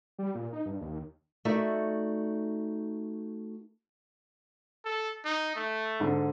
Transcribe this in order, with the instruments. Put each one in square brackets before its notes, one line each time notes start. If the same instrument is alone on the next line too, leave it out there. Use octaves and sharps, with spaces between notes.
[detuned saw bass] G3
A#2
D#4
G2
D#2
[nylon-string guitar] A3 D#4 F#4 A4 D5 E5
[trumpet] A4
D#4
A3
[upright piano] G#2 D3